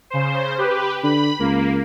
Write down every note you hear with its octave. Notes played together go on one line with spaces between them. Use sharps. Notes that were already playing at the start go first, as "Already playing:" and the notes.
C#3 C5
G4 B4
D3 B5
C#2 A#3